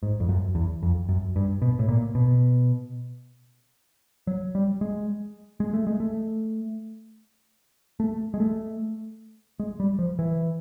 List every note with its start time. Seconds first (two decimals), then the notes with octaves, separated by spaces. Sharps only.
0.03 G#2
0.20 F2
0.29 F#2
0.55 E2
0.83 F2
1.09 F#2
1.36 G2
1.62 B2
1.79 A2
1.88 A#2
2.15 B2
4.27 F#3
4.55 G3
4.81 G#3
5.60 G#3
5.73 A3
5.87 G#3
6.00 A3
8.00 A3
8.34 G#3
8.40 A3
9.60 G#3
9.80 G3
9.99 F3
10.19 E3